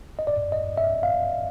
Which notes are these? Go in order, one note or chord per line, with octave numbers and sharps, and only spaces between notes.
D#5
D5
D#5
E5
F5